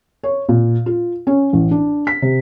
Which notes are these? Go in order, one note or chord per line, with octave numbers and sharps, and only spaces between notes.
C#5
A#2
F4
C#4
A1
D4
B6
C3